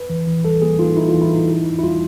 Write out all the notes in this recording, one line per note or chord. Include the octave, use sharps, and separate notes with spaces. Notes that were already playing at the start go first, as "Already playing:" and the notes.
Already playing: B4
E3
E3
G3 A4
A#3 G#4
D#4 F4
D#4 E4
F4
E3
E4
D#4
E4
E4
E4
G3 F4